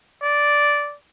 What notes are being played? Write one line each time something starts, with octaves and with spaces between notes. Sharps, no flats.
D5